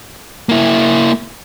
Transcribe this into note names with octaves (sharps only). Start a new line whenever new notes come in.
A#3 E4